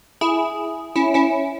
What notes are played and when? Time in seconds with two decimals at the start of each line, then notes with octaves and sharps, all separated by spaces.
0.21 E4 G#4
0.96 C#4 E4
1.14 C#4 E4